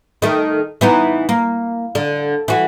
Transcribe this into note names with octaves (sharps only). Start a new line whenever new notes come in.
D#3 A3
E3 B3 D#4
A#3
D3
E3 F#4